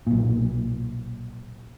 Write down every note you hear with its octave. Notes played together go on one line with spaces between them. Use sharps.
B1 A#2